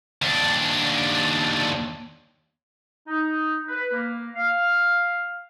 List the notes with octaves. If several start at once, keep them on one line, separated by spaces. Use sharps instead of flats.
D#2 D4
D#4
B4
A#3
F5